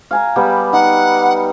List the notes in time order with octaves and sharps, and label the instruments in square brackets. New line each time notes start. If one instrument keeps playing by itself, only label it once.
[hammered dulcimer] F5 G#5 A#5
G3 B3 G4
[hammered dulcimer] D#4 [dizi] F#5